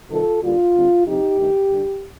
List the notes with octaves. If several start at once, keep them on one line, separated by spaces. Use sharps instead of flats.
C3 D#3 G3 F4 A4
D3 G3 A#3 D4 F4
D2 D3 G3 C4
F2 C3 F3 C4 D#4 G4
G2 D#3 A3 D#4
D3 G3 D4